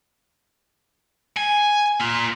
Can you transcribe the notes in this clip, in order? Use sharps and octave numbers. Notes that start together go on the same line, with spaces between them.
G#5
A#3 F4